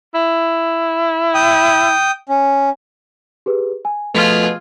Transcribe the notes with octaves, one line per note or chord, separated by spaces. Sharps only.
E4
G5 D#6
C#4
G4 G#4 B4
G#5
B2 F3 A3 F4 G#4 F6 B6 F7